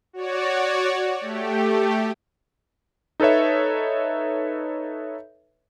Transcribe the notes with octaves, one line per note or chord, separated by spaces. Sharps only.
F#4 C#5 D5
A3 G4
D#4 A4 B4 C#5 E5